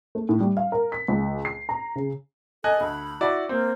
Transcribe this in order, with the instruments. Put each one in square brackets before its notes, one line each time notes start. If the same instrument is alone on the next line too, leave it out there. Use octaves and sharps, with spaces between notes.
[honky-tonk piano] A3
A2
G3
F5
A#4
B6
C#2
C7
A#5
C#3
[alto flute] A4 [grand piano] D#5 G#5 F#6
[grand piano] D2 [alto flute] B5
[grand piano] E4 F#4 D5
[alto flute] A#3 [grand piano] C4